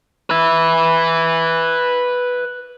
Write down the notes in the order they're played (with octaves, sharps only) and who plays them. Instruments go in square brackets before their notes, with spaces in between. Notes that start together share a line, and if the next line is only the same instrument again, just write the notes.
[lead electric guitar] B4 E5